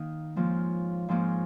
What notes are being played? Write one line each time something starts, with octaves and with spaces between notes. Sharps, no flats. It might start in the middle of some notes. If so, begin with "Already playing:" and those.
Already playing: D#3 A#3 D#4
G#2 F3 A#3 C#4
G#2 F3 A#3 C#4